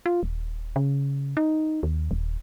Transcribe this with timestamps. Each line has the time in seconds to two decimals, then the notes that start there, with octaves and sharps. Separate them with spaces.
0.06 F4
0.23 D#1
0.76 C#3
1.37 D#4
1.83 D#2
2.11 D#1